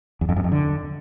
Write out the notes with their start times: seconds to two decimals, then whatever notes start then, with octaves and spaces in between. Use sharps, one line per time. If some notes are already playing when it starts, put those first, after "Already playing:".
0.21 E2
0.29 F2
0.36 F#2
0.44 F2
0.52 D3